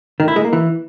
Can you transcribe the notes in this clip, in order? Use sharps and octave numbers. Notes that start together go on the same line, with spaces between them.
D#3
E4
G#3
A#3
E3